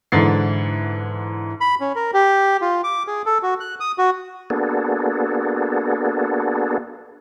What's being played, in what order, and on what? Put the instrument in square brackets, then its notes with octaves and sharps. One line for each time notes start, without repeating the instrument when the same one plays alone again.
[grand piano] G#2 D3 E3 A6 C7
[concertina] B5
C#4
A#4
G4
F4
D6
G#4
A4
F#4
F#6
D#6
F#4
[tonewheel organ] A#3 B3 D4 F#4 G#4 A4